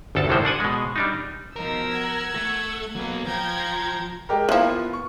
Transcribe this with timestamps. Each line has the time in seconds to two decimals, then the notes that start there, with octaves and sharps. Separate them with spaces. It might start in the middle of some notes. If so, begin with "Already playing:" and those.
0.15 G1 D2 A4 A5
0.29 C2 A2 E3 F3 G#3 C5
0.45 D4 F#5 G#5
0.60 B2 G#3
0.96 G3 D4 D#4
1.56 B2 F3 D#4 A#4 E6
1.89 F#5 G#6
2.35 A3
2.96 F#3 A#3 B3
3.26 F3 G5 A#5 G#6
4.29 G#3 G4 A#4
4.49 E3 F3 A#3 B3 F4
4.93 C#6